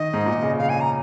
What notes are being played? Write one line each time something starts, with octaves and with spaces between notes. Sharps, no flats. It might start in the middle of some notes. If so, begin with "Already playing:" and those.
Already playing: D#3 D#5
G#2
A#2
C#3
C#3 F5
G#5
A#5